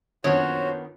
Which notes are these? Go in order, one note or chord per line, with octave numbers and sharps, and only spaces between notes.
A#1 F#2 D#3 B3 F#4 C5 C#5 D#6